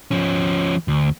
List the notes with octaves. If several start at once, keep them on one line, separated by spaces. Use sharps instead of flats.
F3 C#4
D2